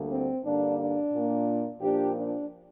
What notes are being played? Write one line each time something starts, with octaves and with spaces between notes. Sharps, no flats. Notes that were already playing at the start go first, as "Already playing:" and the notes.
Already playing: D2 D3 G3 A#3
C4
G2 D3 A#3 D4
D4
A#2 A#3
A#2 F3 A#3 D4 G4
D4